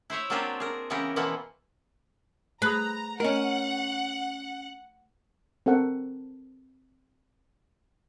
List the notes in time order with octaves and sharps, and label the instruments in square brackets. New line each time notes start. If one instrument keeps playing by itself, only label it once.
[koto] E4 C5 C#5 E5
F#3 A#3 C4 D4 F4 G4
G#4 A#4
C#3 E3 B3 G4 G#4 A#4
B2 E3 F3 A#3 B3
[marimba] A3 G#4 D#6 [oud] B4 [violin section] A#5
[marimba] A3 D#5 [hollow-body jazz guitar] C#4 A#4 [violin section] F#5
[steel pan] C4 A4 A#4 F#5